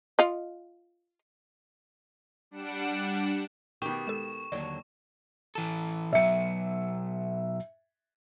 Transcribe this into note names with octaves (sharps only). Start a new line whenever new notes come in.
F4 D#5
G3 D4 F#5 D7 E7
B2 D#3 G4 C#6
G#3 A4 E7
D#2 D3 F#3 D5
E3 A4
B2 F#3 E5 C#7